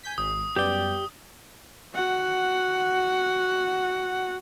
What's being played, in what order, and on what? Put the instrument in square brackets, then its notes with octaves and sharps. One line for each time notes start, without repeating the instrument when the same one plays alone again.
[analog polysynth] G#5 G6 B6
[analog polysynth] G#1 [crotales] D#6
[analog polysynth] F#2 [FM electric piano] G3 B3 D5 [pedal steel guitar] G4 G5
[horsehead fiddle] F#4 F#5